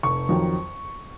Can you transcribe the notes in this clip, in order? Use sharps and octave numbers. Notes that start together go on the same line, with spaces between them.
F1 C#6
F2 D#3 F#3